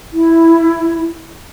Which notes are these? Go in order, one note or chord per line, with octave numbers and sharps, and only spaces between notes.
E4